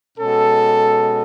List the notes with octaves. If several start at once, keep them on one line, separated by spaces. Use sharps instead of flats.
B2 G#3 C#4 A4